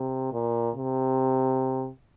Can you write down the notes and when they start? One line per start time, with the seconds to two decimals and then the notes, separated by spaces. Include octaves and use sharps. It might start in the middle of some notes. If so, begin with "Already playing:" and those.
Already playing: C3
0.33 A#2
0.75 C3